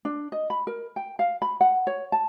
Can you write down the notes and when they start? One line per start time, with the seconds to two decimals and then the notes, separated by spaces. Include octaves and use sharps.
0.05 D4
0.32 D#5
0.50 B5
0.67 A#4
0.96 G5
1.19 F5
1.42 B5
1.61 F#5
1.87 C#5
2.12 A5